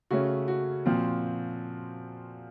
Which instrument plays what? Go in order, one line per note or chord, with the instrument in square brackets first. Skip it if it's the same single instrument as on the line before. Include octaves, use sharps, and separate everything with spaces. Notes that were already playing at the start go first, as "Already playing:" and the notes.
[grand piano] C#3 A3 C#4 F#4
F#4
A#2 F3 C4